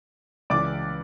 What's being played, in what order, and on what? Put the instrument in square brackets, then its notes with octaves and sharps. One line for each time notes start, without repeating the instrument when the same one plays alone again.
[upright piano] C#2 C#3 E3 D5 D6